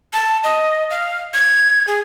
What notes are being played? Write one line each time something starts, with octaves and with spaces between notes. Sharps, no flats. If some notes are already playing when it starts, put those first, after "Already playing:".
A5
D#5
F5
G#6
G#4